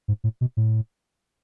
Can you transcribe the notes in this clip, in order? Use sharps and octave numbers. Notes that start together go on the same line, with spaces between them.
G#2
A2
B2
A2